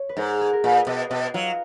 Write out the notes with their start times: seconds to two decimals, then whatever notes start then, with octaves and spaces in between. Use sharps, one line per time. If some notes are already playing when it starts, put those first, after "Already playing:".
Already playing: C#5
0.09 B4
0.17 G#2 A#4
0.41 G#4
0.53 A#4
0.64 A#2 B4
0.87 B2 D#5
1.10 B2 D#5
1.34 F#3 F4